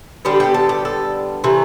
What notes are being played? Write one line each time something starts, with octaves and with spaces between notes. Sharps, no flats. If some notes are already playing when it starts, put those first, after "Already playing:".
D3 G3 B3 G4
G4
A4
G4
A4
C3 E3 A3